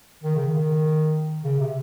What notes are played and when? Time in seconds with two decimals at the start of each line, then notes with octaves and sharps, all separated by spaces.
0.24 D#3
0.35 C#3
0.47 D#3
1.44 C#3
1.60 C3